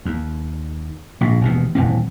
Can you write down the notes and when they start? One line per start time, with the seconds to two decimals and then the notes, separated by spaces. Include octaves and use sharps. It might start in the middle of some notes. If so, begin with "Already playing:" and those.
0.05 D#2
1.21 A#1 G#2
1.41 E1 D#2 B2
1.75 D#1 G#1 E3 C4